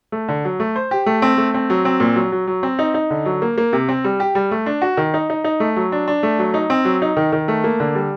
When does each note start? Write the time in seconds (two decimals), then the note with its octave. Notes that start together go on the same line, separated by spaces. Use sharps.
0.12 A3
0.29 D3
0.45 F#3
0.60 A3
0.76 C5
0.91 G4
1.06 A3
1.22 C4
1.38 A3
1.54 C4
1.70 F#3
1.85 C4
2.00 A#2
2.16 F#3
2.32 F#3
2.47 F#3
2.63 C4
2.79 D#4
2.94 D#4
3.10 D3
3.26 F#3
3.42 A#3
3.58 A#3
3.73 C3
3.89 C4
4.04 G3
4.20 G4
4.35 G3
4.51 A3
4.66 D4
4.82 F#4
4.97 D#3
5.14 D#4
5.30 D#4
5.44 D#4
5.60 A3
5.76 F#3
5.92 D4
6.08 D4
6.23 A3
6.39 F#3
6.54 D#4
6.70 C4
6.85 F#3
7.02 D#4
7.17 D#3
7.33 D#3
7.48 A3
7.64 A#3
7.80 D3
7.95 G3